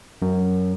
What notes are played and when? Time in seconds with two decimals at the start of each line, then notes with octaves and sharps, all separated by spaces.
0.22 F#2